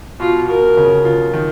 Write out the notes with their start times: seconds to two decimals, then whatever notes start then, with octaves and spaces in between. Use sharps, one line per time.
0.20 B2 F4
0.48 B2 A#4
0.77 C#3
1.05 F4
1.33 D#3